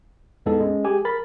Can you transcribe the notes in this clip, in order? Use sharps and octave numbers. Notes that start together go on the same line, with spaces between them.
E2 A2 G#3 B3 D#4 A4
G#3 C#4
G4 G#4 G#5 D6
A#4 B5 A6